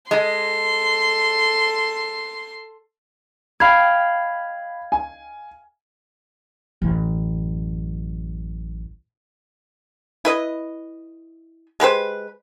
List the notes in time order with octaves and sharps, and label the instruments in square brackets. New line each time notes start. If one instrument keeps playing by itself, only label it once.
[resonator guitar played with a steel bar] G#3 [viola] A4 [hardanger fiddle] C6
[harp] D#5 F5 G5 [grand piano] B5 [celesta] G#6
[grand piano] G#5
[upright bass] A1 F#2
[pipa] E4 B4 D#5
G#3 G4 B4 C5